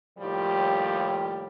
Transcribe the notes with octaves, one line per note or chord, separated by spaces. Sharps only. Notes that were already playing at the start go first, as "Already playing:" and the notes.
D#2 A2 F3 G3 G4